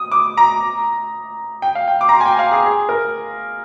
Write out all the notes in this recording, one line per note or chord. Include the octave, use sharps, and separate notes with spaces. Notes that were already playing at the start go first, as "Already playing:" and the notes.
Already playing: D#6
D6
A#5
G5
F5
G5
D6
A#5
C6
G#5
G5
F5
G#4
G#4
A#4